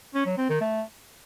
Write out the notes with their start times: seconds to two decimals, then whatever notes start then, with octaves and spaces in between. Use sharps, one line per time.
0.14 C#4
0.26 F#3
0.38 C4
0.49 D#3
0.61 A3